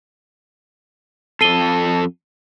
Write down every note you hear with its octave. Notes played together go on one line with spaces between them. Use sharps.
F2 A4 C7 D#7 G7